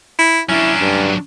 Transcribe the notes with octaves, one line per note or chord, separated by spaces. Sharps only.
E4
F#3 C#4 D4 E4
G2